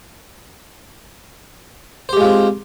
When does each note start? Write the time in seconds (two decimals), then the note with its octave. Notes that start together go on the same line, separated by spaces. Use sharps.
2.09 C5
2.13 G4
2.17 G#3
2.21 F4
2.24 C4